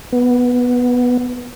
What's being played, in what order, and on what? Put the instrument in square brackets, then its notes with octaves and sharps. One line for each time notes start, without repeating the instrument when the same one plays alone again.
[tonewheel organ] B3